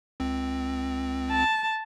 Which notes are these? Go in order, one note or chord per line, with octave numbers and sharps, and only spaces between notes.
C#2 C4
A5